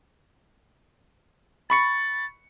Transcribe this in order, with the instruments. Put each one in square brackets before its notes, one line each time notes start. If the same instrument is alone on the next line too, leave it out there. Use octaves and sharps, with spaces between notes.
[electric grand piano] B5 C#6 C#7 [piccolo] A6